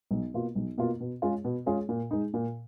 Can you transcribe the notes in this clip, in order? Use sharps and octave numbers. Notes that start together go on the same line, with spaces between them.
B1
B2 A#3 F4
B1
B2 A#3 F4
B2
G#3 C#4 F4 G#4
B2
G#3 C#4 F4 G#4
A#2
G#3 D#4
A#2